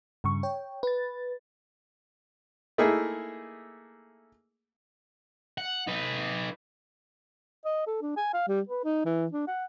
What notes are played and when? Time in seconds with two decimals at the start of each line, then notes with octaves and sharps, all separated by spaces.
0.24 G2 C#3 C#6
0.43 C#5 G5
0.83 B4 A6
2.78 A3 A#3 D#4 E4 G#4
5.58 F#5
5.87 D#4 B4
7.65 D#5
7.87 A4
8.02 D4
8.17 G#5
8.33 F5
8.48 G3
8.68 B4
8.84 D#4
9.05 E3
9.32 D4
9.47 F#5